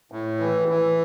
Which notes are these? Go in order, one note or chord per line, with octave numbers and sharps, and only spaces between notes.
A2
E3
E3